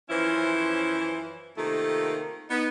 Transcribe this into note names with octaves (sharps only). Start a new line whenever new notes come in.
F#2 E3 F3 C#4 E4 C5
C3 D#3 A3 A#3 F4 A4
B3 D#4